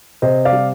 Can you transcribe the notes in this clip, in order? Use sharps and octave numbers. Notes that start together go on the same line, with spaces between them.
C3 C5 D#5
D5 F5
G3